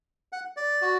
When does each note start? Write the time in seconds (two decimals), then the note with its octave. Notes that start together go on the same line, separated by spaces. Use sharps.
0.33 F#5
0.57 D5
0.82 F#4